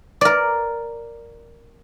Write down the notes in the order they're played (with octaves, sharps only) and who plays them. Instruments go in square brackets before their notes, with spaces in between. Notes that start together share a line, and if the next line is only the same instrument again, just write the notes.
[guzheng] A#4 D5